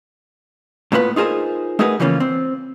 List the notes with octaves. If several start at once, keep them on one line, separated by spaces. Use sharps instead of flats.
A2 A#3 B3 F4 G4 B4
D#4 F4 G#4 A#4 C5
A3 D#4 F#4 G#4 A#4 B4
C#3 E3 F3 A#3 C#4 F4
C4